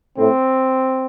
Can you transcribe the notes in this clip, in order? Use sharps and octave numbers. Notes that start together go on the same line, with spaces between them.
A2 C4